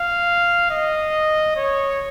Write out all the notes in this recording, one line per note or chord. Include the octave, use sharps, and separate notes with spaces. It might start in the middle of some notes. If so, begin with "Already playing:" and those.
Already playing: F5
D#5
C#5